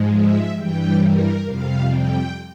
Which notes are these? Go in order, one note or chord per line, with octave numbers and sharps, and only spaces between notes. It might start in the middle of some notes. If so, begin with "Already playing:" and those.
Already playing: G#2 F3 G#3
E5
G2 E3 G3 G5
A#4
F2 C3 G3 F5
G5